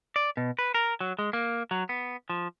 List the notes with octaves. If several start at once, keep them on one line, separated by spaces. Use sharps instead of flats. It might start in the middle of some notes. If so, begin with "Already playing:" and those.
D5
B2
B4
A#4
F#3
G#3
A#3
F#3
B3
F3